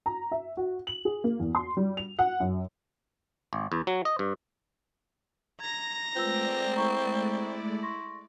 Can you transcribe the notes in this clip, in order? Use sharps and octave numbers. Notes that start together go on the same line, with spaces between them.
A#5
E5
F#4
F#7
G#4
A#3
E2
C6
G3
F7
F#5
F#2
G#1
E2
F#3
D#5
G2
A#5 G#6 A#6
G#3 A3 C4 F4 B4 D5 E6
E4 A#5 C#6
C6 C#6 A#6